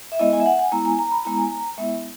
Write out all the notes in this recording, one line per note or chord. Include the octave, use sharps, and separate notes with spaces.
E5
G#3 B3 E4 D#5
G#5
E5
F#5
G#5
G#3 B3 E4 A#5
G#5
A#5
B5
G#3 B3 E4 A#5
G#5
A#5
G#3 B3 E4 E5